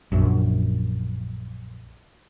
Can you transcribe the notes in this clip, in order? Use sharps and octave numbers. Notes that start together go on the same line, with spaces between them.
A#1 F#2